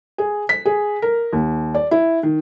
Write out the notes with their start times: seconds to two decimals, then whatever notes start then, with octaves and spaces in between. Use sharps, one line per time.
0.18 G#4
0.49 B6
0.66 G#4
1.02 A#4
1.33 D#2
1.75 D5
1.91 E4
2.23 D#3